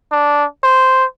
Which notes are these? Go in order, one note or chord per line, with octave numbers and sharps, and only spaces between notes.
D4
C5